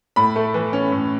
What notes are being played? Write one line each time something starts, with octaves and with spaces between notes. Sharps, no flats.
A2 B5
A3
E3
C#4
A2